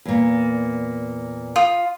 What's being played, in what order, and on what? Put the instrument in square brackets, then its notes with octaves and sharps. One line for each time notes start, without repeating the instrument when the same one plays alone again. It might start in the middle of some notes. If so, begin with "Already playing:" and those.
[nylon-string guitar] E2 A#2
[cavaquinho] F4 D#6